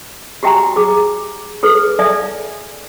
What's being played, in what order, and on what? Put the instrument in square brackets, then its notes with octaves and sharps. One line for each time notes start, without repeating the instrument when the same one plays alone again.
[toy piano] F#4 G4 E5 G5 G#5 A#5
G#4 D6
G#4 A4 B4
A4 D5 E5 F5 G#5